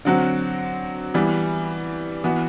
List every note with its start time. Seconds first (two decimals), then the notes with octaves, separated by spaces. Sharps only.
0.05 D3 F#3 C4 F#4
1.14 E3 G3 B3
2.24 E3 B3 F#4